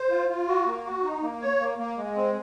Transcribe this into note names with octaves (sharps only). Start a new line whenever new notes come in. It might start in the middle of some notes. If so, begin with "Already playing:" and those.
Already playing: C5
F4
F4
F#4
A#3
F#4
D#4
A#3
C#5
A#3
A#3
G#3
C4